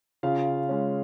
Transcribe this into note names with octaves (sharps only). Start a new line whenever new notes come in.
C#3 F4 F5
G#3 C#4